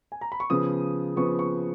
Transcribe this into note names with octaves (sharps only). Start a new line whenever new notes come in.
G#5
A#5
B5
C#6
C#3 F3 B3 D#6
C#3 F3 B3 C#6
C#6